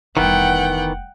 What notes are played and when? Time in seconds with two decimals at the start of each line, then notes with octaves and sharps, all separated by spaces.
0.17 F1 D#3 E3 G3 B3 F#5 G5